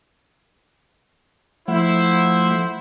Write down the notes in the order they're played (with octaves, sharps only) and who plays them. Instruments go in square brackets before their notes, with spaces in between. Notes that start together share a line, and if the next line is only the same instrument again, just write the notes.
[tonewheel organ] F3 A3 F#5 [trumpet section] E4 C5